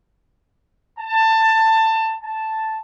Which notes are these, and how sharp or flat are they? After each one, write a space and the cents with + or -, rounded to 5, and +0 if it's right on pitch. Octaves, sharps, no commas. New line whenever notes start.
A5 +20
A5 +0